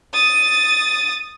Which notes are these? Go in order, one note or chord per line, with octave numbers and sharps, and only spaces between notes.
D#6 A6